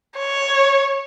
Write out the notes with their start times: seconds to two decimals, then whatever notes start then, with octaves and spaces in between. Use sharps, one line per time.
0.18 C#5